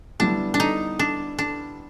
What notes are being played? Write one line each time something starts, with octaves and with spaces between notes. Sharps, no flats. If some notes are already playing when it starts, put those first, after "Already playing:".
D3 G3 B3 D4 E4
D4
D#4
D4
D4